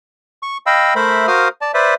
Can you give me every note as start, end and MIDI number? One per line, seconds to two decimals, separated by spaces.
0.43 0.57 85
0.67 0.94 75
0.67 0.94 77
0.67 0.94 79
0.67 0.94 83
0.67 0.94 88
0.96 1.27 57
0.96 1.27 70
0.96 1.27 72
0.96 1.27 76
0.96 1.27 83
1.27 1.48 66
1.27 1.48 70
1.27 1.48 72
1.27 1.48 77
1.27 1.48 87
1.27 1.48 89
1.61 1.72 74
1.61 1.72 81
1.74 1.94 71
1.74 1.94 72
1.74 1.94 74
1.74 1.94 76